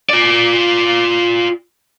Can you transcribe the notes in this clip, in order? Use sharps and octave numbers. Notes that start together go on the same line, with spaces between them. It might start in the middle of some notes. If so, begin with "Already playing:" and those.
F4 D5